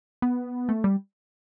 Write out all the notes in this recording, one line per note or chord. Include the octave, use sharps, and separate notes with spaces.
B3
A3
G3